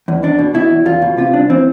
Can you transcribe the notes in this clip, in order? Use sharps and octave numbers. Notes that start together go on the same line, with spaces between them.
E2
E2 D4
B2
B2 E4
E2
E2 F4
B2
C3 F4
C2 D4
E3 C4